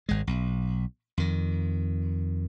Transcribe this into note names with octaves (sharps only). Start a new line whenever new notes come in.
G#1 G#3
B1
F2 D#3